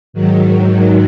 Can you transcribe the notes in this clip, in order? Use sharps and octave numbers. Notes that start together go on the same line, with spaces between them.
G#2 D#3 F#3